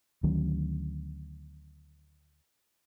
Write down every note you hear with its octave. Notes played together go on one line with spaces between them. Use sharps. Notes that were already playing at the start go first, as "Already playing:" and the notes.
D2 D#3 F#3 C#4